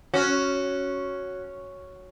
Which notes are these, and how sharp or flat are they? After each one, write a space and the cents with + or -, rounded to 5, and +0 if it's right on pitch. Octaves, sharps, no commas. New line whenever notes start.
C#4 +0 F#4 +0